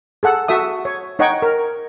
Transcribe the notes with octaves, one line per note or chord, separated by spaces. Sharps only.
G#4 A4 F#5
F#4 A4 E5 D#6
C#5
D#4 C#5 D#5 F#5 G5 C#6
A#4